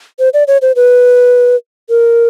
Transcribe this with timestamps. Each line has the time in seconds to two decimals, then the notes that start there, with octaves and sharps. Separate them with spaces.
0.19 C5
0.34 D5
0.48 C#5
0.62 C5
0.76 B4
1.90 A#4